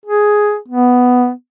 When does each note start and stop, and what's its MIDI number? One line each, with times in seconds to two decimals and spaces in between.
0.06 0.56 68
0.68 1.30 59